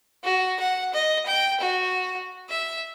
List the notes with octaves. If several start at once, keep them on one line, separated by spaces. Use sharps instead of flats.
F#4
F#5
D#5
G5
F#4
E5